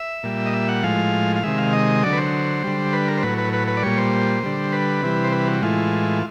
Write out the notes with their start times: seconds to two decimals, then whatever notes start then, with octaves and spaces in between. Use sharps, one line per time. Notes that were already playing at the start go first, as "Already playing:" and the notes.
Already playing: E5
0.23 A#2 G3
0.46 D#5
0.53 E5
0.69 F#5
0.83 A2 F3 G#3 F5
1.36 F5
1.43 C3 D#3 G#3 E5
1.58 F5
1.73 D#5
2.03 D3 F#3 D5
2.13 B4
2.18 C5
2.64 D3 G3
2.93 B4
3.08 A#4
3.18 C5
3.23 A2 F#3 B4
3.38 B4
3.53 B4
3.68 B4
3.77 D5
3.83 A#2 G3 C#5
3.97 C5
4.43 D3 G3
4.73 B4
5.02 C3 E3 G3
5.24 C5
5.32 B4
5.48 F#4
5.62 A2 E3 G#3 F4